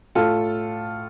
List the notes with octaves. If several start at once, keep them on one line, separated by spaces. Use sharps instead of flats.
A2 F4 A4